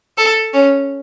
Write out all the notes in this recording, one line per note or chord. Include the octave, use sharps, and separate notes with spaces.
A4
C#4